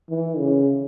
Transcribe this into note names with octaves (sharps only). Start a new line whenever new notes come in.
E3
C#3